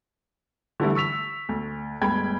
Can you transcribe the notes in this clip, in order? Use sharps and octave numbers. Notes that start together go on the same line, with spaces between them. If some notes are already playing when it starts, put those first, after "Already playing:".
D3 E3 G3 A3 E4
C#6 E6 B6 F7
D2
G1 D2 G#3 G5 B5 G#6